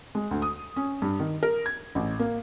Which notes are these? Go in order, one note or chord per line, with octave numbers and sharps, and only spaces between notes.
G#3
D2
D#6
C#4
G2
D#3
A#4
G#6
A1
A#3